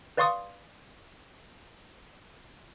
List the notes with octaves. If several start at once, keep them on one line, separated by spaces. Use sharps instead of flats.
B4 D5 F5 C6 C#6 D#6